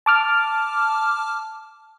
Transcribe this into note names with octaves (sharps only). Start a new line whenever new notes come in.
A5 D6 F6